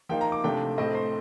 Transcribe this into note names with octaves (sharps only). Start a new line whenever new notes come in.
F3 A#3 D#4 G5
A#5
D6
C3 F3 A3 D4 G5
A2 A3 C4 D#5
C5